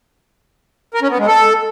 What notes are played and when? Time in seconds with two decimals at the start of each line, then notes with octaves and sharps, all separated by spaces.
0.94 A#4
1.02 C#4
1.10 B3
1.19 G#3
1.27 A4